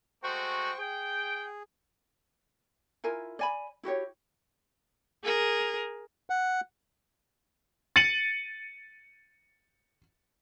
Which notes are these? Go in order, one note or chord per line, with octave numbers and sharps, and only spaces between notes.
G#3 A3 F#4 C5 G5 C#6
G#4 G5
E4 F4 A#4 G#5
D5 G#5 B5
E4 F#4 G4 C#5
G#4 A#4
F#5
A6 C#7 D#7 F#7